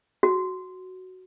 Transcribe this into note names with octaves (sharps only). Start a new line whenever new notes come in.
F#4